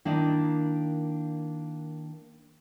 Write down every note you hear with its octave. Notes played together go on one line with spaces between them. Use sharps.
D#3 A#3 D4 E4 D5 D#5